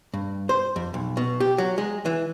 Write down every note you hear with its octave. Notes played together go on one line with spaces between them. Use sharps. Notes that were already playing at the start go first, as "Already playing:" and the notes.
G2
C5
F2
B1
B2
G4
F#3
G#3
E3